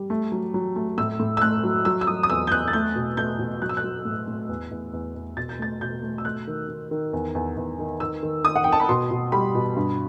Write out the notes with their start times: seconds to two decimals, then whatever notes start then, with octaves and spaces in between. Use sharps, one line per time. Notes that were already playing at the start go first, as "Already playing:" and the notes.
Already playing: G3
0.10 A3
0.32 F#3
0.54 F#3
0.76 A3
0.98 A2 E6
1.20 A2
1.37 E6
1.41 A3 F#6
1.63 F#3
1.85 F#3 E6
2.01 E6
2.07 F#3 D#6
2.23 D#6
2.30 E2 E6
2.47 G6
2.52 E2 F#6
2.68 A6
2.73 A3 G6
2.95 B2
3.17 A3 G6
3.39 B2
3.62 F#3 F#6
3.69 E6
3.77 F#6
3.84 F#3
4.05 A2
4.28 A2
4.49 E2
4.71 E2
4.93 E2
5.15 E2
5.36 B2 A6
5.49 G6
5.59 A3 A6
5.81 B2 G6
6.03 A3
6.18 E6
6.25 A3 F#6
6.47 D#3
6.68 D#3
6.91 D#3
7.13 E2
7.35 E2
7.57 E2
7.79 D#3
8.00 D#3 E6
8.23 D#3
8.44 D#3 D#6
8.56 F#5
8.64 D#3 G5
8.72 A5
8.80 B5
8.89 B2 C6
9.11 B2
9.32 G3 B5
9.55 B2
9.76 G2